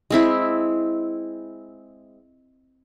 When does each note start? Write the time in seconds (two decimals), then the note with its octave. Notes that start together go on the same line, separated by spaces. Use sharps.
0.10 G#3 C4 E4